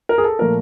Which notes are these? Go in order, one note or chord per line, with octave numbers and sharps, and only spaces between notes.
A#4
G#4
A4
A#2 F3 A3 A#4